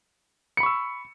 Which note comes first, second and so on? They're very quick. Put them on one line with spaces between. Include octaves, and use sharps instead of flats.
C#7 B5 C#6 E6